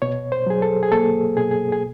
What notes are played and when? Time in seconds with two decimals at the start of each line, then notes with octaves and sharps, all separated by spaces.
0.02 B2 C#5
0.32 C5
0.47 F#3 G#4
0.62 A4
0.83 G#4
0.92 A#3 A4
1.37 B2 G#4
1.51 G#4
1.72 G#4